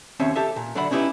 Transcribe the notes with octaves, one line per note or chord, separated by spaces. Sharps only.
D#2 C4 C#4 E5
G4 A4 E5
A#2
D3 F#3 D5 E5 F#5 B5
C#4 D#4 E4 G4 B4